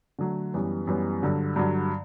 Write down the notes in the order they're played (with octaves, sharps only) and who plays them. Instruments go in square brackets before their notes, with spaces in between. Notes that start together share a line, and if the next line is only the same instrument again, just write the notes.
[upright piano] D3 F#3 A3
F#2 E3 G3 B3
F#2 E3 G3 B3
G2 D3 F#3
G2 D3 F#3